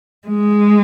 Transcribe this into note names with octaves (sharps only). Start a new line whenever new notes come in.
G#3